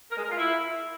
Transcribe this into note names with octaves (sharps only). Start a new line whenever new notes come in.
A#4
G#3
A#4
F4
E4